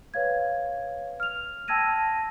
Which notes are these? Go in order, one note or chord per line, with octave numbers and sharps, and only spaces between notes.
B4 C#5 F5 G#6
F6 F7
G5 A5 E6 G#6 A#6 D#7